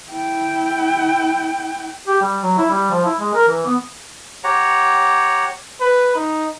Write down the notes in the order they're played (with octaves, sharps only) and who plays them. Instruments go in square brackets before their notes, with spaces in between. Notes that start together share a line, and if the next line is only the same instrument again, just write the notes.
[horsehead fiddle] E4 G5
[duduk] G4
G3
F#3
E4
G3
F3
E4
G#3
A#4
E3
B3
[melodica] G4 C#5 F#5 A#5
[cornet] B4
D#4